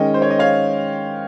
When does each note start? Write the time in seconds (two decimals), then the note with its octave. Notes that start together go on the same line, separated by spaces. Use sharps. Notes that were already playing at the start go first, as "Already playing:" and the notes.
Already playing: D#3 G#3 C#4 D#5 G5
0.14 C5
0.22 C#5
0.30 D#5
0.39 C#5 F5